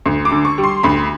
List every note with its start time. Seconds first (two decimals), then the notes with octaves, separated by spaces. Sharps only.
0.06 D2
0.25 D6
0.32 D3
0.45 C#6
0.58 G3
0.64 C6
0.83 D2 B5